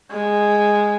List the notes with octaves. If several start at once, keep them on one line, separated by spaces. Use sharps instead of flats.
G#3